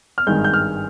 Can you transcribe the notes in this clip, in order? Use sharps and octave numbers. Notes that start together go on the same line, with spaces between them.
F6
G#1 G2 D#3 G#3 G6
G6
F6